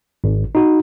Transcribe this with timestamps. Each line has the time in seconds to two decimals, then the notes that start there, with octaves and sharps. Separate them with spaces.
0.24 G#1
0.55 D#4 F#4